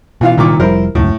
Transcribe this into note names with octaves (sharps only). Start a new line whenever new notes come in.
B2 E3 F4 F5
C2 A#2 D#3 D6
F1 F3 G3 E4 A#4 C5
D#1 C#2 F#2 A2